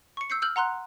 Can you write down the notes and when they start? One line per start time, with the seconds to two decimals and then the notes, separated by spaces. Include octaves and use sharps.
0.17 C#6 C#7
0.30 E6 G6 C7 C#7
0.42 E6 F6 G6 F#7
0.56 F#5 A#5 C6 F#6